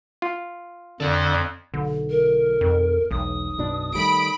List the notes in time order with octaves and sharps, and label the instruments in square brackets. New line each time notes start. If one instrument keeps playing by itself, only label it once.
[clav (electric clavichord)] F4
[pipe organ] F2 [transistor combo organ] D3 [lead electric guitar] A4 D5
[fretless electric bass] B1 [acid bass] D3
[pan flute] A#4
[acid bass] F2
[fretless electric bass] E1 [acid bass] B1 [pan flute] D#6
[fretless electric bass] F#2 B2 D4
[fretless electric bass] D#3 G3 A3 [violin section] B5 D7